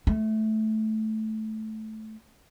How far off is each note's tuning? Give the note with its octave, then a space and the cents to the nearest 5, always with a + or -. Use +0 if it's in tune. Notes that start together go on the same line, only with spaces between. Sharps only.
A3 -10